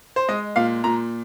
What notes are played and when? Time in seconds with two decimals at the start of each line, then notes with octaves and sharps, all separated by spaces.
0.16 C5
0.28 G#3 D#5
0.56 A#2 F5
0.84 A#2 A#5